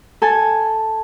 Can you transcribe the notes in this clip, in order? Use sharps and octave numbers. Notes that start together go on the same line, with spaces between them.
A4 G#5 A5